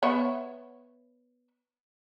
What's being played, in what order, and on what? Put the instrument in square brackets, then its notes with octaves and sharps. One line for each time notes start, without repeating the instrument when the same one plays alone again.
[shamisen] B3 C#5 E5